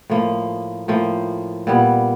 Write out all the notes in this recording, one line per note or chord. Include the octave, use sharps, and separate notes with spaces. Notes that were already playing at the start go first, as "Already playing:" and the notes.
A2 F3 A#3
A2 F3 A#3
A#2 G3 B3